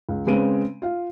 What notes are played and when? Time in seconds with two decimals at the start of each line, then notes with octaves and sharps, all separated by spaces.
0.09 C#2
0.27 C#3 G#3 C4 B4 D7 D#7
0.82 F4 F5